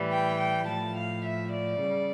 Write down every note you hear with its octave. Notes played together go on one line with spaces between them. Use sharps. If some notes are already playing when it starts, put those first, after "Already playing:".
Already playing: A2 E3 G3
G5
G5
A2 F3 A5
F5
E5
D5
C#3 G3